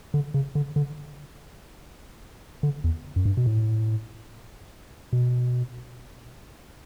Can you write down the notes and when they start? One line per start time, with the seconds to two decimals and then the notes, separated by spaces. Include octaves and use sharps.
0.14 D3
0.34 C#3
0.55 D3
0.76 D3
2.63 D3
2.84 E2
3.16 F#2
3.25 G2
3.37 B2
3.46 A2
5.13 B2